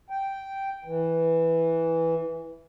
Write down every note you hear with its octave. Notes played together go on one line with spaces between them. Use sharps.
G5
E3